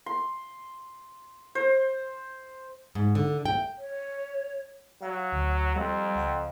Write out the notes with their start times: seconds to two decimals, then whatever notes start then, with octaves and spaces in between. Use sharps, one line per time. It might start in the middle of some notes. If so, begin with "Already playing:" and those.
0.06 C6
1.55 C5
2.95 G#2
3.15 D3
3.46 G5
3.78 C#5
5.02 F#3 F5
5.32 D2
5.76 F2 G3
6.15 C#2 F#5 G5